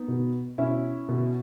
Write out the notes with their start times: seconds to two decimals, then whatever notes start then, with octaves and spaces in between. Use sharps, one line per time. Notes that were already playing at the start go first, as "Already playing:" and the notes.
Already playing: B3 D#4
0.08 B2
0.58 B2 C#4 E4
1.09 B2